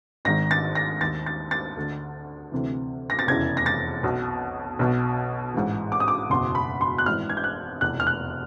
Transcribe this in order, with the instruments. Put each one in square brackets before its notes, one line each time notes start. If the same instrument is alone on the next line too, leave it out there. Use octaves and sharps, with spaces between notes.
[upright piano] G#1 G#2 D#3 A#6
A6
A#6
D#2 D#3 A6
A6
A6
D2 D3
D2 C3 E3
A#6
A6
F1 E2 C#3 E3 G#6
A#6
A6
B1 B2
B1 B2
A1 G#2 E3
D6
D#6
D6
F#1 E2 B2 C6
B5
C6
F#6
G#1 G#2 E3 F6
G#6
G6
F#6
F1 E2 B2 F#6
F6
F#6